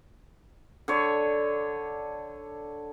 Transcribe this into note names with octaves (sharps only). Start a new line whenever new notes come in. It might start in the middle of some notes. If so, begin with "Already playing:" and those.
D3 C#5